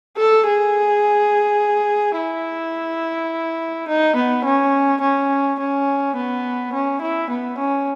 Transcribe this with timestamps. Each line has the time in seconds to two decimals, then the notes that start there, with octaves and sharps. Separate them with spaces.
0.18 A4
0.47 G#4
2.17 E4
3.88 D#4
4.16 B3
4.45 C#4
5.01 C#4
5.59 C#4
6.16 B3
6.73 C#4
7.01 E4
7.30 B3
7.58 C#4